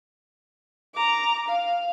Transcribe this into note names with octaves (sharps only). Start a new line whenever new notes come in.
A#5 D6
F5